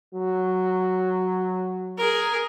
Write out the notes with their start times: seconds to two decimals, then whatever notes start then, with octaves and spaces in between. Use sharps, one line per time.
0.14 F#3
1.98 G#4 A#4